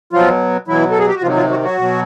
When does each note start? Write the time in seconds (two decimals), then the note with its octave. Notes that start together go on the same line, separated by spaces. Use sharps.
0.13 B2 F3 F#3 F4
0.68 B2 E3 F#3 E4
0.91 A4
0.99 G#4
1.07 G4
1.15 F#4
1.22 C3 D#3 F3 F#3 F4
1.36 F3 F4
1.49 F#3 F#4
1.63 F#3 F#4
1.78 B2 F#3